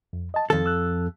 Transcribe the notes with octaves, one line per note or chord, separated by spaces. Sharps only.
F2
D#5 A5
F2 D#3 A4
E6 F#6